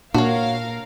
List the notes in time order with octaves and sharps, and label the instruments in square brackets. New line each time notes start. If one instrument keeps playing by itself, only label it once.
[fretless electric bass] A#2 [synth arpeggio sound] D4 [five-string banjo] F#4 C#5 [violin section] A#4 F5